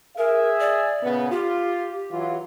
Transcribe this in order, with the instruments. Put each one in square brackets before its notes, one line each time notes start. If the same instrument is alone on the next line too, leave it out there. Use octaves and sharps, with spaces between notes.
[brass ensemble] G#4 E5 [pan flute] A#4
[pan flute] D5
[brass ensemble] A#2 C#3 B3
[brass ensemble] F4 [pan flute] G4
[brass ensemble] E3 F#3 F4